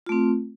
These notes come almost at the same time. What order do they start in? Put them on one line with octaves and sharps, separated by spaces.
F4 A3 C4